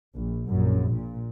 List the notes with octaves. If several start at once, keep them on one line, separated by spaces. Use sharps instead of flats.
A#1
A#1 F#2
A#2